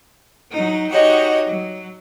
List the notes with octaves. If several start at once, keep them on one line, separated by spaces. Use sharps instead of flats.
F#3 D#4
D#4 F#4 G4 C#5 D#5
F#3